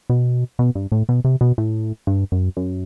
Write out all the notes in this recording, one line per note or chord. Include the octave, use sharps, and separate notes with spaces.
B2
B2
G2
A2
B2
C3
B2
A2
G2
F#2
F#2